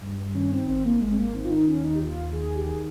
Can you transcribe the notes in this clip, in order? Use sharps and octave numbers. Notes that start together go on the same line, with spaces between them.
G2
D#3 C#4
C4
G#1 C4
A#3
G#1 G#3
C4
A#3
D#3 C4
F4
D#4
D#2 C#4
D#4
G4
D#2 F4
D#3 G#4
G4
D#3 G#4